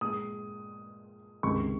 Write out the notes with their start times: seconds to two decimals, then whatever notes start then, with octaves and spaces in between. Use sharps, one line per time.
0.01 A#2 G#3 D#6
1.43 C#2 C3 D#3 G#3 C#6